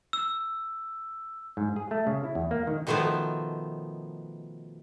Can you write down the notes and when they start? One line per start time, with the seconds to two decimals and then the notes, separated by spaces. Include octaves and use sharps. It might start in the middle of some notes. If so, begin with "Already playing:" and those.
0.13 E6
1.57 G#2
1.76 G#4
1.91 A3
2.07 C#3
2.24 E4
2.35 E2
2.51 A#3
2.67 D#3
2.87 B2 D#3 F3 A3 B3